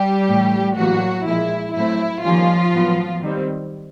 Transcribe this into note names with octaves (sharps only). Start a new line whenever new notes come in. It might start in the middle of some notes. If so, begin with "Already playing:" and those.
Already playing: G3 G4
A2 E3 A3
A2 E3 F#3 G3 A#3 F#4
A#2 F3 G#3 E4
A2 F#3 A3 C4 E4
D#3 F3 G3 A#3 C#4 F4
A2 F#3 B3
D#3 G3 C4